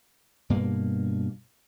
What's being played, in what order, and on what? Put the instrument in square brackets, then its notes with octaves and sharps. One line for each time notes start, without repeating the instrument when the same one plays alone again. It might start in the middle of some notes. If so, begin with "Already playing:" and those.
[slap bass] G2 B2 A#3